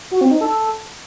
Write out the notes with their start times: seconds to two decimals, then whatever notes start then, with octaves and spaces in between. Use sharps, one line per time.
0.11 F#4
0.21 C4
0.31 D#4
0.41 A4